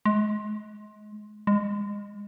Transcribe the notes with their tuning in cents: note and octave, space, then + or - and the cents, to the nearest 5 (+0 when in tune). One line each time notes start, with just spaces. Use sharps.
G#3 +30
G#3 -25